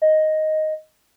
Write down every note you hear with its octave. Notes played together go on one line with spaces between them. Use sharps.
D#5